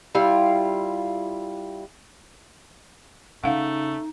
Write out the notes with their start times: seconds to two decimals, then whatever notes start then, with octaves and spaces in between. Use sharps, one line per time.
0.15 G3 E4 F4 F5
3.44 C#3 A3 D#4 F5 F#5